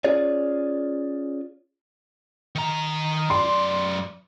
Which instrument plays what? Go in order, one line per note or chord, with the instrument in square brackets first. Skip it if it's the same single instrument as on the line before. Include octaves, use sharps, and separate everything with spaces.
[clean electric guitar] C#4 F4 G#4 C#5 D5
[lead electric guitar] D#3 A#5
[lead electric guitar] F#2 D5 [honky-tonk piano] C6